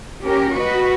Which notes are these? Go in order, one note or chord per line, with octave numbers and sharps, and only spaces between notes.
C#4 G4 A#4
F#4 B4 D#5